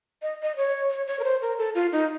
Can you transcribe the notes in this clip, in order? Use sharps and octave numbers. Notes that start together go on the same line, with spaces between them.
D#5
D#5
C#5
C#5
C#5
A#4
C5
A#4
A4
F4
D#4